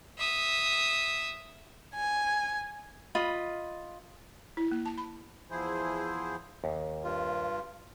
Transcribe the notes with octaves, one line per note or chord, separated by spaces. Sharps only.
E5 D#6
G#5
F4 D#5 B5
E4
A#3
A5
B5
E2 F3 E4 G#4 C5
D#2
G2 F4